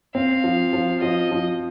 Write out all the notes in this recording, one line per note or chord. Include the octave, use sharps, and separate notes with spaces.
C4 F5
F3
F3
F3 D#5
F3